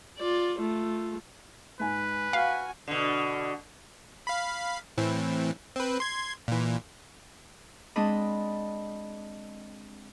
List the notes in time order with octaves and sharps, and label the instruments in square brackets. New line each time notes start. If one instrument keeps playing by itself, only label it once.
[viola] F4 D5
A3 F4
[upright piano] G#2 G#5 [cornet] B4
[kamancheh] F#4 G#5 [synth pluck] F5 [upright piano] F6
[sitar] B2 D3
[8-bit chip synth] F5 B5
A2 E3 C4
C4 B4
C6 G#6
A#2 E3
[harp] G#3 C4 D4 D#5 B5